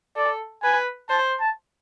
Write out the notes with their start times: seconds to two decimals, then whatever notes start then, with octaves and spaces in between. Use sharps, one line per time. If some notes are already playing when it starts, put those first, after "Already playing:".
0.16 A4 D5
0.63 B4 G#5
1.09 C5 A5
1.40 A5